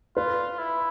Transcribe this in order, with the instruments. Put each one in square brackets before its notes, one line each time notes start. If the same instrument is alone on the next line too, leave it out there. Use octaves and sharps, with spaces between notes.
[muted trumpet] F4 [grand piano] B4
[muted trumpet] E4